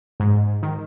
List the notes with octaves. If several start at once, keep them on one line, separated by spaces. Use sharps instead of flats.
G#2
D#3